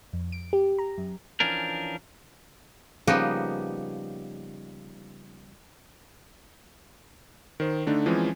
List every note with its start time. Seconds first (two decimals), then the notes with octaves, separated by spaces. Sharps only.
0.13 F2
0.32 D7
0.53 G4
0.79 A#5
0.98 F#2
1.40 E3 F3 C#4 D4 A#4
3.07 C#3 F3 G3 A#3 B3 D#4
7.60 D#3 C5
7.87 D3 A3 D4 D#4
8.06 E3 F3 G#3 C4 C#4